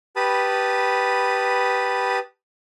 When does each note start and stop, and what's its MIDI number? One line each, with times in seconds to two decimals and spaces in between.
0.16 2.19 67
0.16 2.19 71
0.16 2.19 81
0.16 2.19 83
0.16 2.19 87